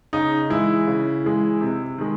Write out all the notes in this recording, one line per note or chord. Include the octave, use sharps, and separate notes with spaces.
C#3 D#4
E3 G#3 E4
C#3
E3 G#3
C3
D#3 G#3